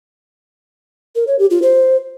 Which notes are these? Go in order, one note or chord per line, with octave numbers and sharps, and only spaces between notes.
A#4
C#5
G4
F4
C5